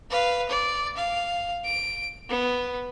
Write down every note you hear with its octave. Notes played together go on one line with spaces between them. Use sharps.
B4 F5
D5
F5
D7
B3